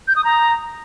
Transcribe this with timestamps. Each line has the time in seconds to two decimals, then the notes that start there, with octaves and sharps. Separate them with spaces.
0.08 G6
0.16 D#6
0.24 A#5